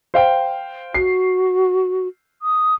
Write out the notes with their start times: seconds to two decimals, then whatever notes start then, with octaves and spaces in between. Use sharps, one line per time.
0.14 C5 F5 G5
0.94 F#4 C7
2.42 D#6